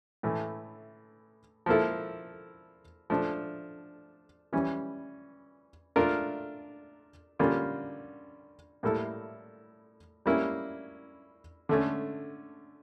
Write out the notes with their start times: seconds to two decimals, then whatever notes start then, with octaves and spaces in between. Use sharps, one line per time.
0.23 A2 E3 A3
1.66 F3 A#3 E4 A4
3.10 F3 A3 D4
4.53 E3 G3 C#4
5.96 A3 D4 F4 A#4
7.39 D3 G3 A#3 C#4 F4
8.83 A2 G3 A#3 E4 A4
10.26 G3 A#3 C#4 E4
11.69 D3 A3 C#4